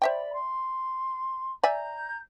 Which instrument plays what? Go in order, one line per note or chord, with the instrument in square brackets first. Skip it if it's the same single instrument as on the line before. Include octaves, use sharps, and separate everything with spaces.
[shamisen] C5 E5 G5 [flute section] D5 B5
[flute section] C6
[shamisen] D5 E5 G#5 [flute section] A#5 G6